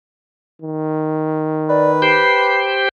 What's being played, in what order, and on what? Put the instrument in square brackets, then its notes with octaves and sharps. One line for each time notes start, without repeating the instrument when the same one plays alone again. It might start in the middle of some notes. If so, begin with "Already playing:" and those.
[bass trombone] D#3
[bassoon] B4 [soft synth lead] D5
[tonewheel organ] G4 C5 G5 [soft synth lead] C7